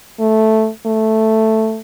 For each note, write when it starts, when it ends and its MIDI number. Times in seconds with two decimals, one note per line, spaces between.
0.20 0.69 57
0.86 1.81 57